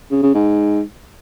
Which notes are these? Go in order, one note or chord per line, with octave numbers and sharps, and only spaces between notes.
C#3
C#3
G#2